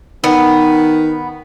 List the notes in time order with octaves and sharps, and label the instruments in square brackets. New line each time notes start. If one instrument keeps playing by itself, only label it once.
[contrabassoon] D#3 [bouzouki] B3